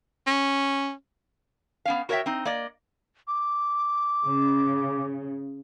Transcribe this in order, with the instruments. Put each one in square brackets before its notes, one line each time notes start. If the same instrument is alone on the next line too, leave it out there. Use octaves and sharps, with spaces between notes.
[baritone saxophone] C#4
[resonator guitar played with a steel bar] B3 C#4 F5
F#4 A#4 C#5 D#5 E5 G5
C4 D#4
A#3 D5 D#5
[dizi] D6
[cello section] C#3